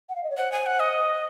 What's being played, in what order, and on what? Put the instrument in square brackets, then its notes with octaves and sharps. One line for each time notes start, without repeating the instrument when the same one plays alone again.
[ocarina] F#5
F5
D#5
C#5
[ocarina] C5 [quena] F#5
[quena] G#5
F#5
D#5